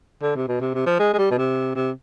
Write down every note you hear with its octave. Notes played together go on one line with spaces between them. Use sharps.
D3
C3
B2
C3
C3
F3
G#3
G#3
G3
B2
C3
C3